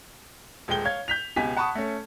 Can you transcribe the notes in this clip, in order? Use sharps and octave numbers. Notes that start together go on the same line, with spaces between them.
D#1 G#3 G5 G7
C#5 F5 G#6
G6 B6 F7
C#2 B2 G4 G#5 B6
F#5 A5 B5 C#6 D#6
A3 C#4